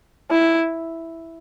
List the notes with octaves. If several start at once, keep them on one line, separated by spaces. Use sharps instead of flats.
E4